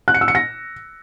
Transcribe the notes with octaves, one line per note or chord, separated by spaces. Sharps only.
F#6
C#7
E6
C#7
A#6